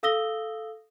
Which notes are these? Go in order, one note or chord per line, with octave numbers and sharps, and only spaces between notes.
A4 F5 D#6 E6 A#6 G7